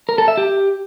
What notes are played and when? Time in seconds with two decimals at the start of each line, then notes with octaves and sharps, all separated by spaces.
0.09 A#4
0.18 A4
0.28 E5
0.37 G4